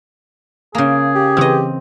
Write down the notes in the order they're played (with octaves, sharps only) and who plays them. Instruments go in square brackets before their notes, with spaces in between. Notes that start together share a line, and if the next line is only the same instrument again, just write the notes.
[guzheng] C#3 A#3 [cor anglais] G#4
[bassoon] G4
[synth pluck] C#3 E3 [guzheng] C4 D#5